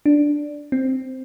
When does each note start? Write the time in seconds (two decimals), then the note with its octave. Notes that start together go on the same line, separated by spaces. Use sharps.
0.06 D4
0.72 C4